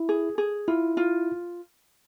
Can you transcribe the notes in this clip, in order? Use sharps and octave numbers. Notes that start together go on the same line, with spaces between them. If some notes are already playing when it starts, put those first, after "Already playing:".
Already playing: E4
G#4
G#4
E4 F4
F4